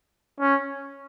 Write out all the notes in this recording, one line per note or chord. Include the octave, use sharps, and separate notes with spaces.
C#4